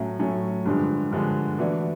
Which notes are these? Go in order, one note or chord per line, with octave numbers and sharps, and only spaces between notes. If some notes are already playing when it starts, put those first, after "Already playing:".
Already playing: A2 F#3 A3 C#4
A2 F#3 A3 C#4
G2 D3 F3 G#3
G2 D3 F3 G#3
E3 A3 D4 F#4